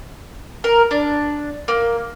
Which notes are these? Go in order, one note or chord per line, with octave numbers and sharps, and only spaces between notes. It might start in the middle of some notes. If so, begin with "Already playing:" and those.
A#4
D4
A#3